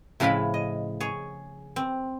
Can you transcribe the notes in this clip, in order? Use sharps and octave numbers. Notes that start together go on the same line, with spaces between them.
A2 C#3 F3 E4 F5 B5
D#5
G#4 C#5
C4